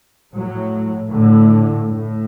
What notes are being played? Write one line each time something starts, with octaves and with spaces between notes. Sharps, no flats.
A2 F#3
A2 D3
A2